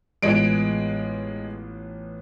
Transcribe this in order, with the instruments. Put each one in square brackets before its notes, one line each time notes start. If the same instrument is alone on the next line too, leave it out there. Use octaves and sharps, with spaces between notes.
[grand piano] A1 B3 F4 [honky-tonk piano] G#3 G#4 D7